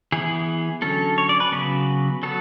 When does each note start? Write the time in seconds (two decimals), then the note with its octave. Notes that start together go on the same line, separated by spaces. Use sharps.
0.12 E3 B3 G#4
0.82 D3 F#3 C#4 A4
1.18 C#5
1.29 D5
1.40 B4
1.52 C#3 F#3 B3 B4
2.23 F#3 B3 A4